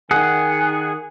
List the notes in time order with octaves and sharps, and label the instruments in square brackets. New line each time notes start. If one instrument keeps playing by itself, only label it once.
[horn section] D#3 G#5 [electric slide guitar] G#4 [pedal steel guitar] F#5